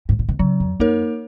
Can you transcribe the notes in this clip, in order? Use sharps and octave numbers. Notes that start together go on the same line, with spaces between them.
G#2
A#2
B2
C#3 F#3
F2
F#2 A#3 D#4 A#4 C#5